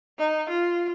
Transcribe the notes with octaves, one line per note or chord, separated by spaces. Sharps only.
D#4
F4